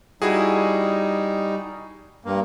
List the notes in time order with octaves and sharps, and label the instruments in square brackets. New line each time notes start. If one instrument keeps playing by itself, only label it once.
[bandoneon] G3 D#4 [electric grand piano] E4 F#4 G#4
[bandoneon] G2 A#3